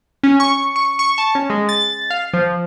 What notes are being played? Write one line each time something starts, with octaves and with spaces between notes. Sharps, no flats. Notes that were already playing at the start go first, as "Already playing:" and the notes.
C#4
C#6
C#6
C#6
A5
C#4
G#3
A6
F5
F3